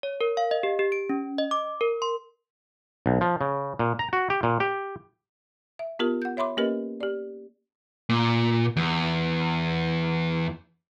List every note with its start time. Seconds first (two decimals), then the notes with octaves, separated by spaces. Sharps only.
0.03 C#5
0.21 A#4
0.37 F5
0.51 D#5
0.63 G4
0.79 G4
0.92 D7
1.09 C#4
1.38 D#5
1.51 D6
1.81 A#4
2.02 C6
3.06 B1
3.21 F3
3.41 C#3
3.79 A#2
3.99 A#5
4.13 F#4
4.30 G4
4.43 A#2
4.60 G4
5.79 E5
5.99 B3 F4 G4 A#4
6.22 F#5 G6
6.37 C#5 E5 B5 C6 D6
6.57 A#3 C#4 G4 A#4 B4 D#5
7.01 G4 D5
8.09 A#2
8.76 E2